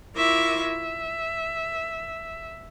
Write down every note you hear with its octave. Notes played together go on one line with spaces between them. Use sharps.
E4 F4 A#4 E5 C#6 D6
E5